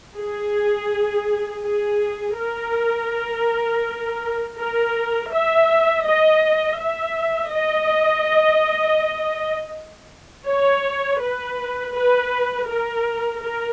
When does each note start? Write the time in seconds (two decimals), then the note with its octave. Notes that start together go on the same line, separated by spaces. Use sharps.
0.17 G#4
1.63 G#4
2.37 A#4
4.58 A#4
5.32 E5
6.05 D#5
6.79 E5
7.53 D#5
10.47 C#5
11.21 B4
11.94 B4
12.68 A#4
13.42 A#4